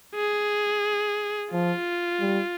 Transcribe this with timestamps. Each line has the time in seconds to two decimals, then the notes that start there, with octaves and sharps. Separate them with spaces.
0.15 G#4
1.52 F3 F4
2.20 G3